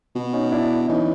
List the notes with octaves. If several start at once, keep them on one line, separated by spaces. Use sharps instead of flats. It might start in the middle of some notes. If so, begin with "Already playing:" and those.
B2
C#4 D#4
D4 E4
E3 C#4 D#4